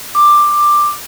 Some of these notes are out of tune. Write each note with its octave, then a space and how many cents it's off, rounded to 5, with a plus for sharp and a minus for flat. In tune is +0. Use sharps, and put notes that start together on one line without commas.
D6 +10